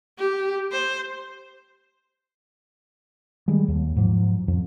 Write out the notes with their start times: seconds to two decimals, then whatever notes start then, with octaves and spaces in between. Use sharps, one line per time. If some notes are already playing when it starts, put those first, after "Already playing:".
0.18 G4
0.72 C5
3.48 D#3 G3 G#3
3.68 D#2
3.96 G#2 F3 F#3
4.48 F2